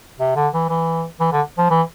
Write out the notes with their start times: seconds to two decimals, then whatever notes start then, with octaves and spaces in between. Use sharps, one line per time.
0.20 C3
0.36 D3
0.53 E3
0.69 E3
1.20 E3
1.32 D3
1.58 F3
1.70 E3